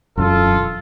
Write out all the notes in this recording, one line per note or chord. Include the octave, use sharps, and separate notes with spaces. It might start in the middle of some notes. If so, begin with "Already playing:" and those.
E1 F#2 F4 A4